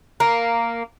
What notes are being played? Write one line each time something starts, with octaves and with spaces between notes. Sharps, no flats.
A#3